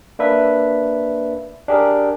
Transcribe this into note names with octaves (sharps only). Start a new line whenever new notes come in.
A#3 D4 B4 E5
D4 G4 G#4 A#4